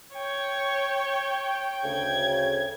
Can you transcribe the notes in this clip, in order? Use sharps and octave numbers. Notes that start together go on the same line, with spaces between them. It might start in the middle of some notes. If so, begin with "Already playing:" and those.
C#5 G5
D2 C#3 G#6